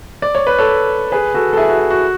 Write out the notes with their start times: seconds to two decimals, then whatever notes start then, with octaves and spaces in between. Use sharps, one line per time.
0.22 D5
0.35 C#5
0.47 B4
0.59 A4 C#5
1.12 G#4 B4
1.34 F#4 A4
1.53 A4
1.57 E4 G#4
1.69 F#4
1.79 E4
1.90 F#4